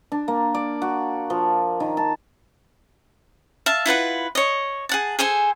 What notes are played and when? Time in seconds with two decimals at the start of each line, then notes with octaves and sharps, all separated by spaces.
0.12 D4
0.28 A#3
0.55 D5
0.82 F#4
1.30 F3
1.80 D#3
1.97 A5
3.66 E5 F5 A5
3.86 E4 F4 B4 F#5
4.35 C#5 D#5
4.89 G#4 F#5 A5
5.19 G#4 A4 C5 G#5